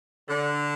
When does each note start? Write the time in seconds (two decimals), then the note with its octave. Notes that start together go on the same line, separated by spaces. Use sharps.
0.29 D3